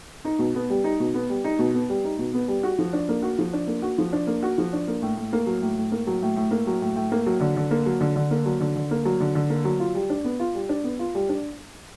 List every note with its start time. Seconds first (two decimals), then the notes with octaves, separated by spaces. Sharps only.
0.25 D#4
0.39 B2
0.55 B3
0.70 G3
0.84 D#4
1.00 B2
1.14 B3
1.30 G3
1.44 D#4
1.59 B2
1.74 B3
1.89 G3
2.04 D#4
2.19 B2
2.34 B3
2.48 G3
2.63 F#4
2.79 F3
2.93 D4
3.09 A#3
3.22 F#4
3.39 F3
3.53 D4
3.67 A#3
3.82 F#4
3.98 F3
4.13 D4
4.27 A#3
4.43 F#4
4.58 F3
4.73 D4
4.88 A#3
5.02 A2
5.17 A2
5.33 A#3
5.47 F#3
5.62 A2
5.77 A2
5.92 A#3
6.07 F#3
6.22 A2
6.36 A2
6.51 A#3
6.67 F#3
6.81 A2
6.96 A2
7.12 A#3
7.26 F#3
7.40 D3
7.56 D3
7.71 A#3
7.86 F#3
8.01 D3
8.16 D3
8.31 A#3
8.46 F#3
8.61 D3
8.76 D3
8.91 A#3
9.05 F#3
9.20 D3
9.35 D3
9.50 A#3
9.65 F#3
9.80 F4
9.95 G3
10.10 D4
10.24 B3
10.40 F4
10.55 G3
10.69 D4
10.84 B3
10.99 F4
11.15 G3
11.29 D4